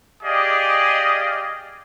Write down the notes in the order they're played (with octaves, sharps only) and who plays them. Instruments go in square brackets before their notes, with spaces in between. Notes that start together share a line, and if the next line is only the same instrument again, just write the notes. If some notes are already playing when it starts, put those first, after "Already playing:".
[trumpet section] G4 G#4 D5 D#5 F5